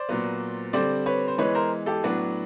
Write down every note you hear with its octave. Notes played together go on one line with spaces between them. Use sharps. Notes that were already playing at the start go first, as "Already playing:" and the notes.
Already playing: C5 D5
A#2 F#3 B3
D3 G3 C4 C5 D5
B4 C#5
C5
E3 G#3 B3 B4 C#5
A#4 C5
G4 A4
A2 F#3 B3 D4 F#4